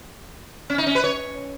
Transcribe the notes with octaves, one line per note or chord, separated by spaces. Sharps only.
C#4
D#4
C#4
B4
C#5